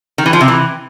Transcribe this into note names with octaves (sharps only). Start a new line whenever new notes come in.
D#3
E3
F3
C3
E3